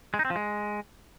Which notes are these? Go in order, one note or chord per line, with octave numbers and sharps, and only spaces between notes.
G#3
D#4
C4
F3
G#3